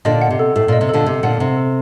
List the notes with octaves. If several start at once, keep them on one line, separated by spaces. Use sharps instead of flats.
A#2 D3 D#5
F#5
C3
A4
A2 A4
A#2 D#5
C3
A#2 D3 A4
C3 A4
A#2 D3 F#5
C3 A4
A4